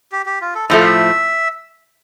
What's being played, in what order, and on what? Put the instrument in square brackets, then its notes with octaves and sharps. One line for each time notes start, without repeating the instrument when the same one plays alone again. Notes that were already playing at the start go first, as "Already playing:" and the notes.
[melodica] G4
G4
F4
A4
[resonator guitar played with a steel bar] A2 F3 A3 [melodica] A4
[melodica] F5
E5